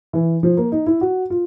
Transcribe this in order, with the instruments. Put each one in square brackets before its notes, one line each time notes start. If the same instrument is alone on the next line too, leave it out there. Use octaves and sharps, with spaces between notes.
[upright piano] E3
F3
A#3
D#4
E4
F#4
F4